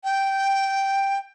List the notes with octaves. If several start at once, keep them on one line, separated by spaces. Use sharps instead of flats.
G5